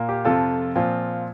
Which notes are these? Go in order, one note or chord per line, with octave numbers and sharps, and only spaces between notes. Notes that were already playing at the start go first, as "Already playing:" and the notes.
Already playing: A#2 A#3
G4
F2 C3 F3 F4 A4
A#2 F3 C4 F4